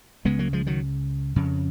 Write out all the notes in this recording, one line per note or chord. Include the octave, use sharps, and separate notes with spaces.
C#2 C#3 G#3 B3
F#3 A#3
F3 G#3
D#3 F#3
F2 C#3